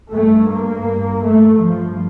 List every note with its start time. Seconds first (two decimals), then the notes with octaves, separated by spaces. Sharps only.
0.10 G2 A3
0.48 A#3
1.24 A3
1.61 G2 F3